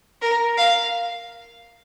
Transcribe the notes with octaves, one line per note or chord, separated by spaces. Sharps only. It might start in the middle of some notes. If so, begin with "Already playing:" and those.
A#4
F5